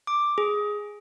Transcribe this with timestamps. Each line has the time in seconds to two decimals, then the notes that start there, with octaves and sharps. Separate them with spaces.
0.07 D6
0.38 G#4